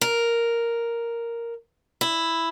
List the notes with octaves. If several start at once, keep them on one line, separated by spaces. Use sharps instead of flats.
A#4
E4